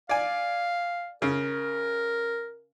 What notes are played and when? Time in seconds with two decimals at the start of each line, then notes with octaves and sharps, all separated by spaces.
0.09 D5 F5 G#5
1.22 C#3 A#4